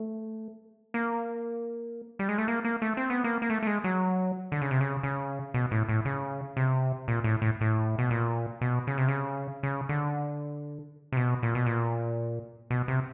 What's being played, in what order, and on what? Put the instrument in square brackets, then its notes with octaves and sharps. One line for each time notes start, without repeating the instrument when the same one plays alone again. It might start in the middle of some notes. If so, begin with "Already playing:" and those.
Already playing: [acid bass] A3
A#3
G3
G#3
A3
A#3
A#3
A3
C4
B3
A#3
A#3
A3
A3
G#3
F#3
D3
C#3
C3
C#3
C#3
B2
A2
A2
C#3
C3
A#2
A2
A2
A2
B2
A#2
B2
C#3
C3
C#3
C#3
D3
C3
B2
A#2
B2
A#2
B2
C3